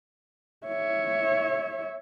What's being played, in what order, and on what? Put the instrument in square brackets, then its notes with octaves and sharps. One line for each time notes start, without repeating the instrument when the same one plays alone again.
[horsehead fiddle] C#5 E5